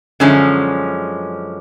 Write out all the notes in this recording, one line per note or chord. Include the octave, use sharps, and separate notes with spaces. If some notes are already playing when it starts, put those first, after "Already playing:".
F#2 D3 F3 G#3 C#4